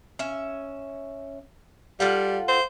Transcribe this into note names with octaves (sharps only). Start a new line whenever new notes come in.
C#4 E5
G3 F4 A4 F#5
C5